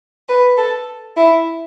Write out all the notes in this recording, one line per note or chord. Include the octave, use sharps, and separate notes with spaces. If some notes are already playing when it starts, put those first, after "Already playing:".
B4
A4
E4